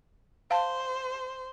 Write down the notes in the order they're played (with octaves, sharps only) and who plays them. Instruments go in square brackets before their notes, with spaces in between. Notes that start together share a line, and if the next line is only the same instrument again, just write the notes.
[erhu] C5 [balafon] F5 A5